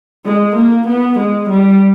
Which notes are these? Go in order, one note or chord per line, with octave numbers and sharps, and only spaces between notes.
G#3
A#3
B3
G#3
G3